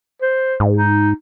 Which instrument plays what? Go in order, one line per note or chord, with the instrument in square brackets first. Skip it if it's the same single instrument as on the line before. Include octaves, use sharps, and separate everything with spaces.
[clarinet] C5
[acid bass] G#2
[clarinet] D#4